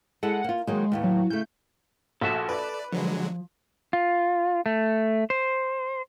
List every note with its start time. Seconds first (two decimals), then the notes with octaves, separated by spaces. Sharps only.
0.23 G#3 E4 A4 F#5
0.44 A#3 F4
0.67 D#3 F#3 G#3 A#3
0.92 D#2 A2 B3
1.04 F#3
1.30 C#3 A3 G6
2.21 A#1 F#4 A4 E5 A5
2.49 B4 D5
2.92 D3 F3 F#3 G#3
3.93 F4
4.66 A3
5.30 C5